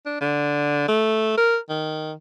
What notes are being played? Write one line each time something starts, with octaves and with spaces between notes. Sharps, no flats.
D4
D3
A3
A#4
D#3